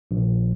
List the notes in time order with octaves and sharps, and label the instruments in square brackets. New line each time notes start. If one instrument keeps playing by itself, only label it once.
[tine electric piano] A#1